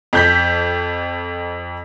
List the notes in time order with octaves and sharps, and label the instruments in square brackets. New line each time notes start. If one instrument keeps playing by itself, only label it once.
[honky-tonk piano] F2 G6 B6